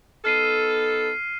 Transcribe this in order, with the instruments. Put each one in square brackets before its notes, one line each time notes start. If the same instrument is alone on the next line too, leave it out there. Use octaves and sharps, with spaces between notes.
[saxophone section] B3 D#4 A4 [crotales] F6 C7 D#7